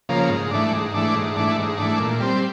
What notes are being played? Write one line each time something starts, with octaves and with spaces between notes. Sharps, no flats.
C#3 F3 A#3
G#2
E3 A3 D4
G#2
E3 A3 D4
G#2
E3 A3 D4
G#2
E3 A3 D4
A#2
G3 C4